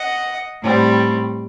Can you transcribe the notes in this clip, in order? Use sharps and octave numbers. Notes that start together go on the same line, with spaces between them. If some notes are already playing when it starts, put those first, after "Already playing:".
Already playing: D#5 F#5
A2 G3 C4